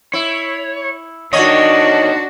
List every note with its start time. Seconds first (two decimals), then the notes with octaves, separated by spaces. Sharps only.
0.13 E4 C#5
1.33 E2 D#3 D4 D#4 F#4 C#5 D#5